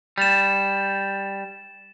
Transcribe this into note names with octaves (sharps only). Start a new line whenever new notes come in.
G3 A6 E7